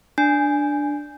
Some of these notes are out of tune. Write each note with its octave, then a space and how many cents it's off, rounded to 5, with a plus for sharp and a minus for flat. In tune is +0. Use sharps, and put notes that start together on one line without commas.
D4 +0 G#5 +0